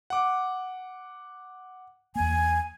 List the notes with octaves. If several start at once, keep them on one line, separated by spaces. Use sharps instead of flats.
F#5 D6
E2 A#3 G#5